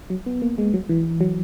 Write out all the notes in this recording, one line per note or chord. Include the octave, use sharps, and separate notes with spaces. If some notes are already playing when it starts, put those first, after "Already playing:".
F#3
B3
A#3
G#3
F#3
E3
F#3